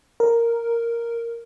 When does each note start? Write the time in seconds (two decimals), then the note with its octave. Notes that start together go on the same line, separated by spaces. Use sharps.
0.20 A#4